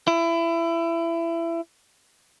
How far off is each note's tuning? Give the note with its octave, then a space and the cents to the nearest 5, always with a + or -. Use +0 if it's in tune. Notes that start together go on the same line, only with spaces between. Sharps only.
E4 +25